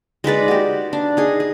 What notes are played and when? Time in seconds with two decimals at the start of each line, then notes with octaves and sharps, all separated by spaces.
0.24 G#3 D#4 B4 D5
0.48 F#4 G4
0.93 D4
1.17 D#4 G#4
1.40 G#4